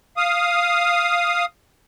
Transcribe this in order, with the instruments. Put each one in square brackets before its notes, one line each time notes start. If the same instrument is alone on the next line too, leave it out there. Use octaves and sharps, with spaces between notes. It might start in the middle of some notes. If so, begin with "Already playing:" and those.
[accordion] F5 D#6